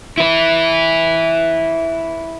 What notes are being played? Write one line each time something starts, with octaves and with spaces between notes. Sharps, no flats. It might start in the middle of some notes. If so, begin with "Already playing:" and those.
E4 B4